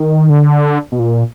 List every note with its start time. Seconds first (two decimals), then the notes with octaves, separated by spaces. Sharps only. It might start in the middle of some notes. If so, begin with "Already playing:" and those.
Already playing: D#3
0.30 D3
0.92 B2
0.99 A#2